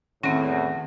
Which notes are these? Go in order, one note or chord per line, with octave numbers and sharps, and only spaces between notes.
E2 A2 D#3 C4 C#4 F#4